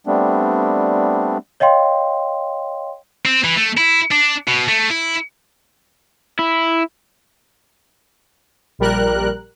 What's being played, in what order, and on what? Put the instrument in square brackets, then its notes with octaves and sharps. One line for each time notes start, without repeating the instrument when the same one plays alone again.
[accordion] G3 A3 B3 C4 D4
[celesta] C#5 D#5 F5 G5 C6
[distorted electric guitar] C4
E3
A3
E4
D4
B2
A3
E4
[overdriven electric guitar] E4
[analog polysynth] A#1 G3 A#4 F#6